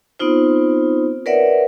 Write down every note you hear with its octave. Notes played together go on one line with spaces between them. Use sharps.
B3 C4 D#4 F4 C5
A#4 B4 C#5 D5 E5 F#5